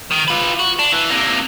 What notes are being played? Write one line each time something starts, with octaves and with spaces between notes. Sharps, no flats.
D#3
F4 B4
F#4
D4
E3
C3 A#3